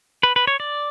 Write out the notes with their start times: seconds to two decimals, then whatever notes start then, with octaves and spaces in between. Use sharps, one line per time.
0.23 B4
0.36 B4
0.47 C#5
0.60 D5